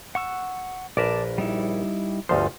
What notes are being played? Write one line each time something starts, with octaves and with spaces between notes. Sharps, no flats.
F#5 C#6 E6
A#1 A#4 B4 D5 A5
G3 D#4 E4
G1 D2 F3 D#4 A4 C5